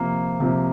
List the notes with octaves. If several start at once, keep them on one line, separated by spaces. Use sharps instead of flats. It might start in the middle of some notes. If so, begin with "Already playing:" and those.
Already playing: C3 F3 A#3
C3 F3 A#3